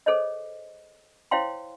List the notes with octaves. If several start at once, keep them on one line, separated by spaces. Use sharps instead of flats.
G#4 A4 C5 C#5 D#5
E4 C5 C#5 F5 G5 C6